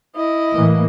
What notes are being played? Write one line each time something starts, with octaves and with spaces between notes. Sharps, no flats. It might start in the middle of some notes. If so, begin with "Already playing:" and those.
E4 D#5
A2 E3 A#3